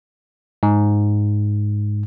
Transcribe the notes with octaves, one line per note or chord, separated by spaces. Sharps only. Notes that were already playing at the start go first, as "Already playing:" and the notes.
G#2